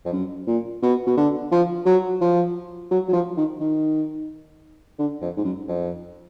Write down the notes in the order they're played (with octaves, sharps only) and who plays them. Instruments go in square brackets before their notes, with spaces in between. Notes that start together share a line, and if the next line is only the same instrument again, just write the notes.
[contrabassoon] F2
F#2
A#2
B2
B2
D3
F3
F#3
F3
F#3
F#3
F3
D#3
D#3
D3
F2
G#2
F#2
F2